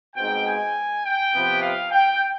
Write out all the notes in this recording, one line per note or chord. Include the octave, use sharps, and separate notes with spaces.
B2 G#3 C4 D#4 G5
G#5
G5
C3 F3 B3
F5
G5